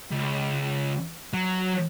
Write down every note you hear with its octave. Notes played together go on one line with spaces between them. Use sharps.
C#2
F#3